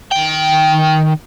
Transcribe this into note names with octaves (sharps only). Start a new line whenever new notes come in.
D#3 G5